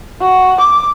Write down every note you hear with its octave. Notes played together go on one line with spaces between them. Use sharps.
F#4
D6